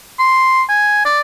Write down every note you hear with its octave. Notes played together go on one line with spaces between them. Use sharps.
C6
G#5
D5